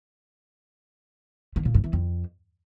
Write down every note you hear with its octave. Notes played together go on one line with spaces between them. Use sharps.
D#3
A#2
G2
E3
F2